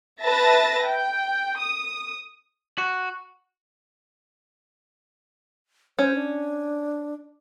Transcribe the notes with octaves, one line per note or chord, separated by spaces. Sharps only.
B4 E5 A5 A6 A#6
G5
D#6
F#4
C#4 C5
D4